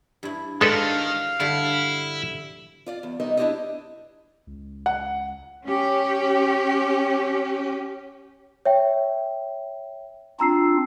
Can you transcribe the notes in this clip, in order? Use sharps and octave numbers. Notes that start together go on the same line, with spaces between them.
G2 E4
D#3 G#3 D4 A4 B4 F5
G2 D3 E4
F4 D5 F5
E2
C3 G3 B3 D#4 D#5 E5
D4 E4 F4 G4 D5 D#5
C#2
F#5
C#4 G4
C#5 E5 G5
C4 D4 F4 A#5 E6 C7